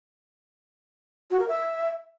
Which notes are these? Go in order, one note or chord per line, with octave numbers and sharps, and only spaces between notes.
F#4
A#4
E5